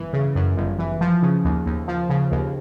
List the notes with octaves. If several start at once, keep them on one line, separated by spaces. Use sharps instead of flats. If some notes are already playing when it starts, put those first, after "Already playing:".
Already playing: G1 E3
C#3
F#2
G1
E3
F3
C#3
D#2
D#2
F3
C#3
D#2